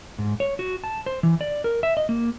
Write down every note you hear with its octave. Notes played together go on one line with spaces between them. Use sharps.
G#2
C#5
F#4
A5
C5
E3
D5
A#4
E5
D#5
A#3